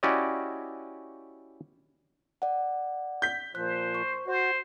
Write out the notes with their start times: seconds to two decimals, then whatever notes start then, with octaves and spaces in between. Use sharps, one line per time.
0.03 C#4 E4 F#4 G4 D5 D#5
2.42 D5 F#5
3.22 G6 B6
3.55 A#2 F3 C5 F#6
3.95 C#6
4.27 F#4 C5